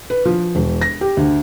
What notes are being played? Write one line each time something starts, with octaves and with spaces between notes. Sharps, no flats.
B4
F3
E1
A#6
G4
D2